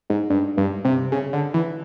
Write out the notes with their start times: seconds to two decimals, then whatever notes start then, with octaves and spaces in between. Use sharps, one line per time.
0.10 G#2
0.30 G2
0.57 G2
0.85 C3
1.12 C#3
1.33 D3
1.54 E3